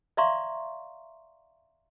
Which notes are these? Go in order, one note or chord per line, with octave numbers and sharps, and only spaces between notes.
D5 E5 F5 A#5 C6 C#6